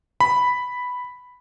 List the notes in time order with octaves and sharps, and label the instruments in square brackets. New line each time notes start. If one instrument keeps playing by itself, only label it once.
[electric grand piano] B5